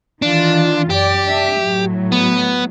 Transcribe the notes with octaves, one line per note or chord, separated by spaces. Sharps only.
D#3 E3 D4 F4
F#2 G4 D5
D4 E5
A2 F#3
B3